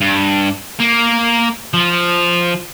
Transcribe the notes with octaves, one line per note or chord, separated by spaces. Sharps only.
G2
A#3
F3